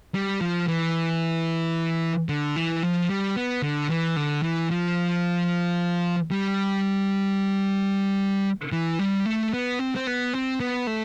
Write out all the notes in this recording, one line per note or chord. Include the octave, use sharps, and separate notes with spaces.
G3
F3
E3
D3
E3
F3
G3
B3
D3
E3
D3
E3
F3
G3
E3
G3
A3
B3
C4
C4
B3
C4
B3
A3